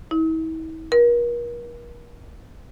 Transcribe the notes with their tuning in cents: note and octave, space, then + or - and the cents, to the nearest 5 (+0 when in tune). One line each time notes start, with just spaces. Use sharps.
E4 -45
A#4 +40